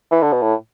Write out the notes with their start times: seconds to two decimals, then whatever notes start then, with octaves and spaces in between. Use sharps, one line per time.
0.11 E3
0.22 D3
0.33 B2
0.42 A2